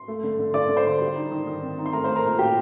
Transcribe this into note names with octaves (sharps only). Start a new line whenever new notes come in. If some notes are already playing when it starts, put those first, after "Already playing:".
Already playing: C6
A3
D3
D3
D3 D5 D6
D3
C5 C6
D4
G3
D#4
D#3
D#3
C4
D#4
C6
A3 A#4 A#5
A3 C5 C6
A#4 A#5
A#2
A#2 G4 G5